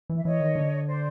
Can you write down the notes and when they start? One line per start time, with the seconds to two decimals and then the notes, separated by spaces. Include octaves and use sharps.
0.10 E3
0.16 E5
0.24 E3 C#5 D#5
0.40 D#3
0.56 D3
0.87 C5 D5